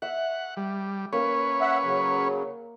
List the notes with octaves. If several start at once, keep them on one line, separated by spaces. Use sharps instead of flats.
E5 F#5
G3
A#3 C#4 B4 C#5
E5 F#5
C#3 F#3